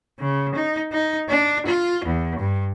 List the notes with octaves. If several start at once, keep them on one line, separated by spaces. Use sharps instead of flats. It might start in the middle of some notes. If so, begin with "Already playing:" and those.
C#3
D#4
D#4
D4
F4
E2
G2